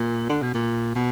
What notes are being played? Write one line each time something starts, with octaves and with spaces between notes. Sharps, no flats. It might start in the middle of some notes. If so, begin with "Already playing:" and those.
Already playing: A#2
D3
B2
A#2
B2